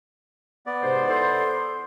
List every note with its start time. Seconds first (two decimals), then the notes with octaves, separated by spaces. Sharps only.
0.66 B3 D5
0.82 G#2 C3 C5
1.07 E4 A4 C5